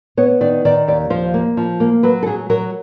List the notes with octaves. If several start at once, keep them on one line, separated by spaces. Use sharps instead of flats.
B3 C#5
D#3 D5
D#3 D5
D#2 D5
F3 C5
A#3
F3
A#3
F#3 B4
A4
F#3 G#4
F#3 A#4